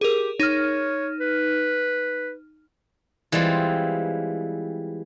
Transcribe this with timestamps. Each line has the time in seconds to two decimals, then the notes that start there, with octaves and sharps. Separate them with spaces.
0.01 G4 G#4 A#4
0.40 D#4 C#5 F6
1.20 B4
3.32 E3 G3 G#3 C4 F4